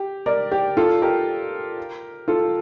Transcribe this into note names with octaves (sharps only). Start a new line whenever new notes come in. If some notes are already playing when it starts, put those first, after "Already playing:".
Already playing: G4
A#4 D5
G4
F4 A4
G4 A#4
F4 A4